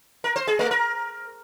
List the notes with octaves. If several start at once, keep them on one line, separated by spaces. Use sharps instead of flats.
A#4
C5
G#4
A3
A#4